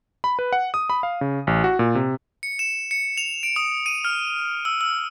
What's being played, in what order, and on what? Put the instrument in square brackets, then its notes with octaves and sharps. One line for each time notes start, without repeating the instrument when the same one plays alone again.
[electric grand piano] B5
B4
F#5
D#6
B5
F5
C#3
A1
F#4
A#2
C3
[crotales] C#7
E7
C#7
F7
D7
D#6
D#7
F6
E6
E6